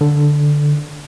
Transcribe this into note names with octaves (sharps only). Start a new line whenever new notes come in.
D3